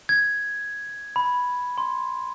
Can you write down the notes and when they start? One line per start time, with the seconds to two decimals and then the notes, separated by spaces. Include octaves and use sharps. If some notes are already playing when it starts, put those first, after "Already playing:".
0.09 G#6
1.16 B5
1.78 C6